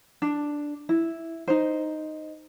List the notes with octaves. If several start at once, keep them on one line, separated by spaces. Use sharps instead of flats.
D4
E4
D#4 C5